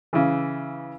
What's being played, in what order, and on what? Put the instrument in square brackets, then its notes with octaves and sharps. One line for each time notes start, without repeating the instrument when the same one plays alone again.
[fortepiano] C#3 E3